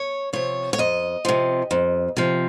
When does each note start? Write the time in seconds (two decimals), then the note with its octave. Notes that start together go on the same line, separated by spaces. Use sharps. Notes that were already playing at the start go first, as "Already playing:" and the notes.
Already playing: C#5
0.33 C3 F3 C#5
0.73 C#5
0.78 F2 D#5
1.25 C3 F3
1.71 F2
2.17 C3 F3